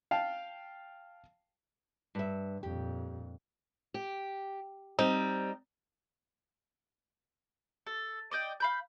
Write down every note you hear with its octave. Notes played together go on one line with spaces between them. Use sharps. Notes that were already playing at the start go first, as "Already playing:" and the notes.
F5 G5 A5
G2 E5
F2 A#2 G4
G4
G3 C4 D#4
A4
D5 D#5 G5
F5 B5 G6